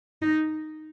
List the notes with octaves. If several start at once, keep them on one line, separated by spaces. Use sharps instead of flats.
D#4